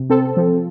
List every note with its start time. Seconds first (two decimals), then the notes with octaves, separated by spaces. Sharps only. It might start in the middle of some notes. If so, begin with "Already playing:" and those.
Already playing: C3
0.10 C4 A4
0.37 F3